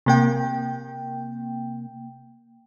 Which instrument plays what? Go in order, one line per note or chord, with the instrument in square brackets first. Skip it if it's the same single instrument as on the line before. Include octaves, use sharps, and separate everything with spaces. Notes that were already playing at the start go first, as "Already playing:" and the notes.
[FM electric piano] C3 A#3 G5